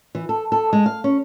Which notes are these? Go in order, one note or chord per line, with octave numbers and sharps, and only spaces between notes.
E3
A4
A4
G#3
F5
C#4